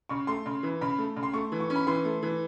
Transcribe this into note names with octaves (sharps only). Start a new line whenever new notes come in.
C#3 C#6
A3 C6
C#3
E3
C#3 B5
A3
C#3
C6
A3 C#6
E3
C#6
C#4
B5
E3 C6
A3
E3